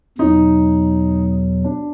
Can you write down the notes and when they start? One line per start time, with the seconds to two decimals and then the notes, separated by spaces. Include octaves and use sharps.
0.18 E2 B2 F#3 D#4
1.64 D4